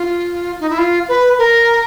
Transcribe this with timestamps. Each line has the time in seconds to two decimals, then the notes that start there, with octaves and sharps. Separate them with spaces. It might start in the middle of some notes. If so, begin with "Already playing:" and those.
Already playing: F4
0.60 D#4
0.70 E4
0.78 F4
1.09 B4
1.38 A#4